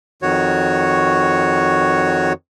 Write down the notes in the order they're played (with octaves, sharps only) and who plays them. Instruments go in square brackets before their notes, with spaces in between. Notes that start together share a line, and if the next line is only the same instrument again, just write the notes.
[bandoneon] F2 D#3 F#4 C#5